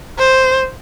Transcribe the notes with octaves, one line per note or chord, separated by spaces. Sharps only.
C5